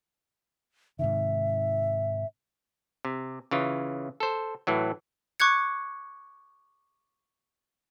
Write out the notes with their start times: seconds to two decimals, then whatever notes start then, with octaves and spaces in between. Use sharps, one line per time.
0.99 G#2 C3 D#3 E5
3.05 C3
3.51 C#3 E3 F4
4.20 A4 C5
4.67 A2 E3 F#3
5.40 C#6 D6 F#6 G#6 C#7